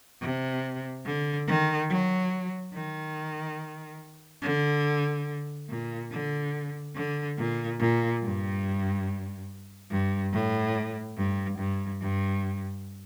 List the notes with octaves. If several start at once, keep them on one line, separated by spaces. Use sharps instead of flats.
C3
D3
D#3
F#3
D#3
D3
A#2
D3
D3
A#2
A#2
G2
G2
A2
G2
G2
G2